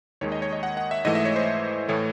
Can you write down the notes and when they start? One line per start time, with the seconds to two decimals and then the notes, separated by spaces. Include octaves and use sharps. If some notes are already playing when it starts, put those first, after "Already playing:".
0.21 D#2 D#3 G#3 C#5
0.32 D#5
0.42 C#5
0.53 D#5
0.63 F#5
0.77 F#5
0.91 E5
1.05 G#2 E3 A3 D#5
1.15 E5
1.25 C#5
1.36 C5
1.88 A2 E3 A3 C#5